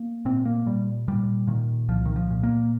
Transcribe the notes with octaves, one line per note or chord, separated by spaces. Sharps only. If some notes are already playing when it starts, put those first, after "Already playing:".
Already playing: A#3
A#2 C4
A#3
A#2 G3
A#2 G3
A#2 D#3
C2 F3
D#3
F3
A#2
A#3